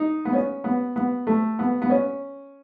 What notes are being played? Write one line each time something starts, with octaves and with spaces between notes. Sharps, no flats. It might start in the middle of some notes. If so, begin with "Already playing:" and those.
Already playing: D#4
B3
C#4
B3
B3
A3
B3
B3
C#4